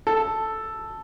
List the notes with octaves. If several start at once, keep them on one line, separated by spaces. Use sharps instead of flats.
A4